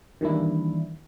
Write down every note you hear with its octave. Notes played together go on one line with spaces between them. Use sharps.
D#3 E3 G3 A#3 D4 E4